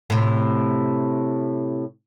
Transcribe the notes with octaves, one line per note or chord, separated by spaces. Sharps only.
A2 C3